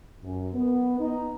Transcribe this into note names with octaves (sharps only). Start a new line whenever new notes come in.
F#2
B3
D#4